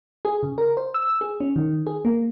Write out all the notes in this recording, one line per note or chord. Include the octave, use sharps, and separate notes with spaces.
G#4
C#3
A#4
C5
E6
G#4
C#4
D#3
G#4
A#3